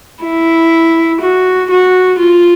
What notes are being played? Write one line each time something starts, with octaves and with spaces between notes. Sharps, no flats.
E4
F#4
F#4
F4